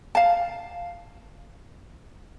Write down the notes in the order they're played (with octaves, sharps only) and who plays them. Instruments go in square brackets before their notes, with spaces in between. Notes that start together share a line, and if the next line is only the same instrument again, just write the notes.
[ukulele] F5 A5